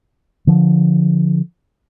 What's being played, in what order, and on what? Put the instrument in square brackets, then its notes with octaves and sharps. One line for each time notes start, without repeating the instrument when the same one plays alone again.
[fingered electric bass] D3 F3